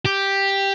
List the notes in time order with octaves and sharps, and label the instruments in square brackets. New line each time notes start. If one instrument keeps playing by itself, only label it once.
[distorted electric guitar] G4